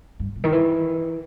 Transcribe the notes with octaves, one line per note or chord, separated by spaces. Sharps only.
G2
B2
D#3
E3